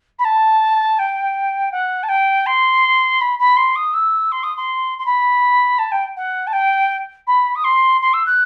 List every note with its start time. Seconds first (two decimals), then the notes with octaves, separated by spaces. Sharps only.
0.19 B5
0.24 A5
0.99 G5
1.72 F#5
2.03 A5
2.09 G5
2.46 C6
3.21 B5
3.39 B5
3.57 C6
3.76 D#6
3.94 E6
4.32 C6
4.43 D#6
4.57 C6
4.98 C6
5.06 B5
5.78 A5
5.92 G5
6.16 F#5
6.47 A5
6.53 G5
7.27 B5
7.55 D#6
7.64 C6
8.01 C6
8.13 E6
8.26 F#6